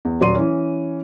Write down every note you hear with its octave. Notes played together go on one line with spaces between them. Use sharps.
E2
D#1 F#3 D5 C6 D#7
E3 C#4